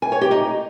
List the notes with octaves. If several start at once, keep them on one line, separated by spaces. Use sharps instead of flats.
G#5
C#5
G4
D#4